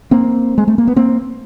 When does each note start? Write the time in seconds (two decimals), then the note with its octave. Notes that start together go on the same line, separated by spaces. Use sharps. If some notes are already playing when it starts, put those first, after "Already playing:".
0.11 A#3 C4
0.58 G#3
0.68 A3
0.78 A#3
0.87 B3
0.96 A#3 C4